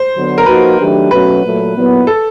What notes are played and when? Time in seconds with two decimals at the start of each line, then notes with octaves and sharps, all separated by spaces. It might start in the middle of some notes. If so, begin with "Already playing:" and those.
Already playing: C5
0.15 D3 F#3 B3
0.38 A#4
0.46 F3 A#3 D#4 F#4 B4
0.79 D#3 F#3 A3 D4 G4
1.11 B2 F#3 A3 C#4 F#4 B4
1.43 A#2 F#3 A3
1.75 A#2 F#3 B3 E4
2.07 A4